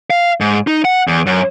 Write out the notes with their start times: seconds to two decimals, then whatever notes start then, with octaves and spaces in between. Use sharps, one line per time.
0.10 F5
0.41 G#2
0.67 D#4
0.85 F#5
1.08 E2
1.26 F#2